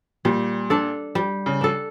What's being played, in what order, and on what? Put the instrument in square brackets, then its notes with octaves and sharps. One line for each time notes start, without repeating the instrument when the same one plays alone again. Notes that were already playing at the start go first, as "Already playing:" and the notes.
[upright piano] A#2 [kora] G3
[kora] D4 A4
G3
[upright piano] C#3
[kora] D4 A4